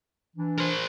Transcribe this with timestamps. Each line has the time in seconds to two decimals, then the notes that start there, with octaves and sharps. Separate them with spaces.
0.36 E3 D4
0.59 A#4 C5